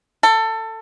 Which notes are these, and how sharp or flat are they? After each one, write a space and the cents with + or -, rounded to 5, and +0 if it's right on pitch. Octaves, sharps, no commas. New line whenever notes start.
A4 +20